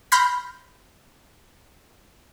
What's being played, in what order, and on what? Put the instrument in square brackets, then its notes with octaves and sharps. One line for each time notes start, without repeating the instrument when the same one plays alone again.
[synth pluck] B5 C6 F6 G6 A#6